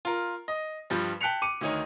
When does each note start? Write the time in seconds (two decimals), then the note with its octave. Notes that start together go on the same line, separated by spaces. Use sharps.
0.05 F4 A#4
0.48 D#5
0.90 G2 F3 G3
1.21 G5 A5 F#6 B6 C#7 F7
1.42 D6 C#7 D#7
1.61 D2 D#3 D#4 C#5